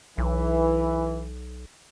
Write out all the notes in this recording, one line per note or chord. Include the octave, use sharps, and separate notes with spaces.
B1 E3